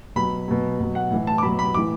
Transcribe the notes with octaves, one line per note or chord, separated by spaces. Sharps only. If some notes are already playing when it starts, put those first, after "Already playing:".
B2 F#3 B5
B2 F#3
B2 F#3
F#5
A2 E3
A5
D6
B2 F#3 B5
B5
A2 E3 D6